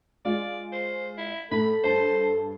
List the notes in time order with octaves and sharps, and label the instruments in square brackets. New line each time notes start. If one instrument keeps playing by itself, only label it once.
[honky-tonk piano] G#3 F4 [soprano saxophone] D5
[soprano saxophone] C5
E4
[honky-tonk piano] A2 [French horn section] A4 [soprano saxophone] B5
[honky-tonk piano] G2 A5 [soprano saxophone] C5